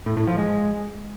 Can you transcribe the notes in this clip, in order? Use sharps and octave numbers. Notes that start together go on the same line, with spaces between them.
A2
A2
F3
G#3